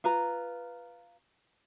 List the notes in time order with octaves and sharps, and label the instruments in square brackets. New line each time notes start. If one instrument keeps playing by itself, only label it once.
[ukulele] F4 B4 A#5